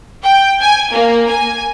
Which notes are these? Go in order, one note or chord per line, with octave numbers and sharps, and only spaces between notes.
G5
G#5
A#3
G#5